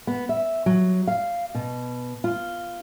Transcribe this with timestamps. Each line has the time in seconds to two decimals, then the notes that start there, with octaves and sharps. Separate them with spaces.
0.07 B3
0.29 E5
0.66 F#3
1.07 F5
1.55 B2
2.24 F4